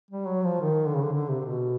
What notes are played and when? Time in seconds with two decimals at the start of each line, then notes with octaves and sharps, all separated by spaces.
0.11 G3
0.28 F#3
0.45 F3
0.61 D#3
0.87 D3
0.94 C#3
1.02 D3
1.12 D3
1.28 C3
1.40 C3
1.45 B2